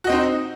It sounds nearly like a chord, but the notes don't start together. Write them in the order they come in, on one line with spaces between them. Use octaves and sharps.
F#4 D#5 C4 D#4 C5